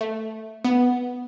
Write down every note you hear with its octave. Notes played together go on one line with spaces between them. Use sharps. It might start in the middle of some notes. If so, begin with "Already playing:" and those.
A3
B3